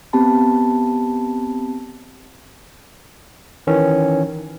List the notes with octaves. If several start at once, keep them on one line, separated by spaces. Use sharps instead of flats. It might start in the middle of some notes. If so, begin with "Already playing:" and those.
B3 C4 G4 A5 B5
D#3 E3 C#4